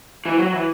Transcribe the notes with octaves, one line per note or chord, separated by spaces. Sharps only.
E3
F#3
E3